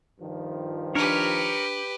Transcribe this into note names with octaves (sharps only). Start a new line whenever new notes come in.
G2 D#3 F3
D4 G4 A#4 B4 C#5